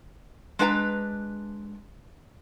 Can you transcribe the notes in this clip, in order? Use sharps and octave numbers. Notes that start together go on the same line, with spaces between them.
G#3 D4 B4 G5 A#5